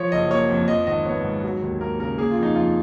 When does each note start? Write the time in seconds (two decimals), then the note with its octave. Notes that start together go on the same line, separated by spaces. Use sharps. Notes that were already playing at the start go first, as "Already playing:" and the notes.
Already playing: F3 C#5
0.12 F#1 D#5
0.31 A#3 C#5
0.50 F2
0.68 F3 D#5
0.87 G#1 D#5
1.05 B3 C#5
1.24 G#2
1.43 F#3
1.62 D#2
1.81 A#3 A#4
1.99 C#3 A#4
2.18 A#3 G#4
2.31 F4
2.37 F2
2.43 D#4
2.56 F2 F4